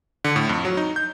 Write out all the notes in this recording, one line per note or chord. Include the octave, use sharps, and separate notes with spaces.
D3
A2
F2
F#3
D#4
G6